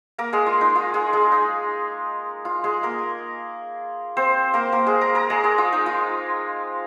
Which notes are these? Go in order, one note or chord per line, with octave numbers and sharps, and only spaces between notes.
A#3 A#4
G#3 G#4
F4
D#4
F4
G#3 G#4
G#3 G#4
D#4
F4
G#3 G#4
A#3 A#4
C4 C5
A#3 A#4
A#3 A#4
G#3 G#4
A#4 A#5
A#4 A#5
G#3 G#4
G#3 G#4
F4
D#4
F4